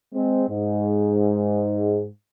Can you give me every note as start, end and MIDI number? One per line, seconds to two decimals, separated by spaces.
0.14 0.44 56
0.14 0.44 60
0.49 2.06 44